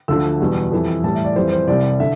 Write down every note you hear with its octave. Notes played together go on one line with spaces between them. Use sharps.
D2 D3 F3 E6
E2 B2 G3
F2 E3 G3
A2 E3 G3 A5
E5
D5
F2 E3 G3 C5
C5
C2 C3 G3 D5
D3 E5